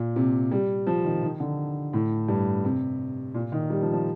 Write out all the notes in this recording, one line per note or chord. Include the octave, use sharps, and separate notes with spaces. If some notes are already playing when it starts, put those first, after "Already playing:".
Already playing: A#2
C3
G3
F3
D#3
D#3
D3
A2
G2
C3
A#2
D#3
G3
F3
F3